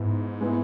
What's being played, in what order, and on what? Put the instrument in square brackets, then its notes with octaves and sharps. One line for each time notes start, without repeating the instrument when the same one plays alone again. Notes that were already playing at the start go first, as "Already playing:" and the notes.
Already playing: [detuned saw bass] G#2 [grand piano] B3 E4
[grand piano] G#3 B3 E4